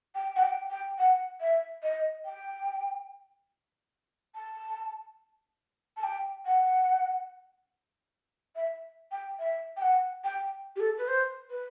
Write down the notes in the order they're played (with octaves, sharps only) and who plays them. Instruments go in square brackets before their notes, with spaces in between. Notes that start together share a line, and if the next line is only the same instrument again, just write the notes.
[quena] G5
F#5
G5
G5
F#5
E5
D#5
G5
A5
A5
G5
F#5
E5
G5
E5
G5
F#5
G5
G4
A4
B4
C5
B4